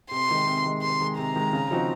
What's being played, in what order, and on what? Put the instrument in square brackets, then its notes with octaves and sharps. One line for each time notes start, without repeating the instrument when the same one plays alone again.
[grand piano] C3 [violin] C6
[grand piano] D#3 G#3
C3
D#3 G#3
[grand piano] C3 [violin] C6
[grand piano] D#3 G#3
[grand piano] C3 [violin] A#5
[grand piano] D#3 G#3
C#3
F3 C4 D#4 F#4